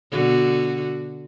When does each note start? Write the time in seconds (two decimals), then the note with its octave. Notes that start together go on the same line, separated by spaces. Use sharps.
0.11 B2 D3 F#4